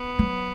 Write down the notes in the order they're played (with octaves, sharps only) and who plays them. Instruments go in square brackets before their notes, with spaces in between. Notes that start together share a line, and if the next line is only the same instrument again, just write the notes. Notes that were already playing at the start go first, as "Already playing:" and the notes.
Already playing: [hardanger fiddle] B3
[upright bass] F#3